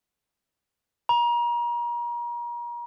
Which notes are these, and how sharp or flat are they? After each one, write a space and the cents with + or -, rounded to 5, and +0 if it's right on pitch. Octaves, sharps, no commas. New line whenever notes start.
A#5 +35